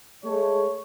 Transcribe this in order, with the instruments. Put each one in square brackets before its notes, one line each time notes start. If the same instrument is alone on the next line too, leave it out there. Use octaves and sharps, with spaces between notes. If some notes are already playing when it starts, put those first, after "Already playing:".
[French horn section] G#3 A3 [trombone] C#5